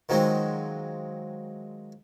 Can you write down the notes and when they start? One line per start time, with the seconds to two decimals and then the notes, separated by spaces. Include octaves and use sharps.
0.09 D#3 F3 F#3 G#3 C4